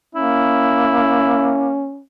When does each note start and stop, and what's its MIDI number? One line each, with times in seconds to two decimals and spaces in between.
0.15 1.88 58
0.15 2.03 61
0.15 1.71 64